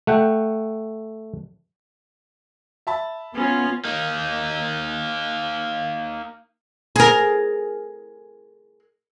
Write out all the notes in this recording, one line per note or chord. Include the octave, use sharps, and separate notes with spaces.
A3 F#5 G5
E5 A5 B5
B3 C#4 F4
A#3 D#4
G#4 A#4